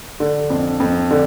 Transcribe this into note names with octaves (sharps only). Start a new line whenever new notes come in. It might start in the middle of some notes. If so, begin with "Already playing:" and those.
D3
F2
F2
D3